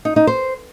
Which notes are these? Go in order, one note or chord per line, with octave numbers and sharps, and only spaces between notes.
D#4
D#4
C5